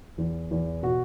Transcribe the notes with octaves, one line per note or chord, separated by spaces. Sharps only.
E2
E2
B2 F#4